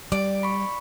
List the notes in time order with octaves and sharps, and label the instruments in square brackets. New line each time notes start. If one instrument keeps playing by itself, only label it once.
[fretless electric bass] G3 [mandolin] D5
[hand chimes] B5 C#6